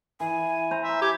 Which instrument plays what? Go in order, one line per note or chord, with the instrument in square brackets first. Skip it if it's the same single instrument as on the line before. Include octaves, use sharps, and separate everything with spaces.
[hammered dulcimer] E3 [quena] G#5
[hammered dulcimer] C5 A#5
[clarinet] E5
[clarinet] G4 [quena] G#6